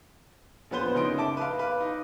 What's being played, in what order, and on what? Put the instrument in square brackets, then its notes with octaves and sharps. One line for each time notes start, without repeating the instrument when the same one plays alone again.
[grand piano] A#1 F3 B3 B4 C5 G7
F#1 C#4 D#4 C6 D7
E5 A5 D6 D7
B4 F5
B4 F5
D#4